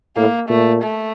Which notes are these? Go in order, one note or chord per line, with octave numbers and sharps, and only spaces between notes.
A2 A#3
A#2 A3
A3